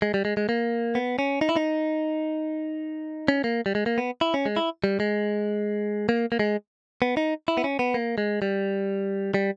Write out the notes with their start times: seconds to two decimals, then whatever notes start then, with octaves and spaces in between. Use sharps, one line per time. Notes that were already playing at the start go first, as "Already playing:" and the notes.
0.02 G#3
0.14 G3
0.25 G#3
0.37 G#3
0.49 A#3
0.95 B3
1.19 C#4
1.41 D#4
1.49 E4
1.56 D#4
3.28 C#4
3.44 A#3
3.66 G3
3.75 G#3
3.86 A#3
3.98 B3
4.21 E4
4.34 C#4
4.46 G#3
4.56 E4
4.84 G3
5.00 G#3
6.09 A#3
6.32 A#3
6.39 G#3
7.02 B3
7.17 D#4
7.48 E4
7.57 B3
7.64 C#4
7.79 B3
7.94 A#3
8.18 G#3
8.42 G3
9.34 G3